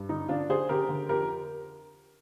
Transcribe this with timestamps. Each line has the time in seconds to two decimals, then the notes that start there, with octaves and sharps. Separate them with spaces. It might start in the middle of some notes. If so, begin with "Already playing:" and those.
Already playing: G2
0.09 D3 D#4
0.29 D3 D4 F4
0.49 D3 G#4 C5
0.69 D3 G4 A#4
0.89 D3
1.09 F2 G4 A#4